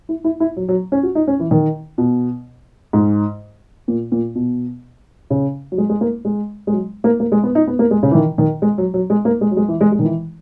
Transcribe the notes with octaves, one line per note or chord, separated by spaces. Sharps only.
E4
E4
E4
F#3
F#3
C#4
F#4
D#4
C#4
E3
D#3
B2
G#2
A#2
A#2
B2
C#3
F#3
G#3
G#3
A#3
G#3
G#3
F#3
A#3
A#3
G#3
B3
D#4
B3
A#3
G#3
C#3
E3
D#3
D#3
G#3
F#3
F#3
G#3
A#3
G#3
F#3
G#3
E3
G#3
G#3
D#3
E3